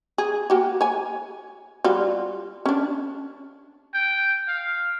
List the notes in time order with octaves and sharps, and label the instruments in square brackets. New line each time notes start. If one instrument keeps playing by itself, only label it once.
[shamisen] G#4
A#3 F#4 G4
C#5 G#5
G3 F4 F#4
C#4 D4
[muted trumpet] G5
F5